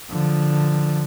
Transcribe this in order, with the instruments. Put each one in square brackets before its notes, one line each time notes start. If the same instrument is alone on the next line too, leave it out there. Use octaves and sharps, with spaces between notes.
[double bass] D3 F3